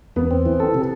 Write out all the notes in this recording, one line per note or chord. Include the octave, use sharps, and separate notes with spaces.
E2 B3
C4
E3
A4
C3